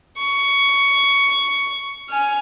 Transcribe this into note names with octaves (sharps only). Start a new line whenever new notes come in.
C#6
G#5 F6